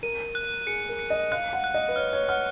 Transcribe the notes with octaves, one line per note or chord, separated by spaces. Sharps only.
A#4 D#7
F#6
G#4 C#7
A#4
C#7
D#5
F5 F#6
F#5
F#6
D#5
B4
C#5 F6
C#5
F#5 F6